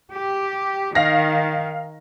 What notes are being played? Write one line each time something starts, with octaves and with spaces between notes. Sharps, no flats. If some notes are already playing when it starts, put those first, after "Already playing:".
G4
D#3 F5 A#6